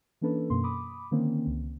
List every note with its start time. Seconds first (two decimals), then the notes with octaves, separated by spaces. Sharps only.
0.21 E3 A#3 C#4 D4 A4 B4
0.50 F#2 B2 A#3 C6
0.64 B5 D6 D#6
1.11 D3 D#3 A#3 C4 C#4
1.47 C#2